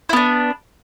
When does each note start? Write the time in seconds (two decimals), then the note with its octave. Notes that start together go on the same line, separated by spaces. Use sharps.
0.09 E4
0.13 B3
0.16 D4